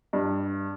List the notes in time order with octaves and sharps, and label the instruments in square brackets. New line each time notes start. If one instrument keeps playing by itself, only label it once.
[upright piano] G2